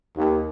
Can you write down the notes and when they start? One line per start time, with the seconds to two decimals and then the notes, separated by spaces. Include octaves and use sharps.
0.16 D#2